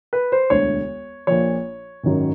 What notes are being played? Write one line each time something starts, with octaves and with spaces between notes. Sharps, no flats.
B4
C5
E1 D2 D3 C#5
A#1 A#2 F3 C#5
G#1 F#2 D#3 F#3